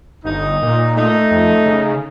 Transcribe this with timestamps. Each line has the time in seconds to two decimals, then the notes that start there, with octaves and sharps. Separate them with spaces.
0.25 G1 D#4
0.63 A#2
0.97 A3 D#4
1.31 F2
1.66 C#3